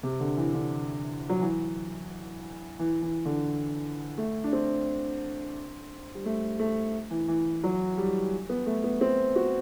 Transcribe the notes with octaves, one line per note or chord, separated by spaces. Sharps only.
C3
D3
E3
D3
F#3
E3
E3
E3
D3
A3
D4
C4
G3
A3
A3
E3
E3
F#3
G3
B3
A3
B3
C4
F#4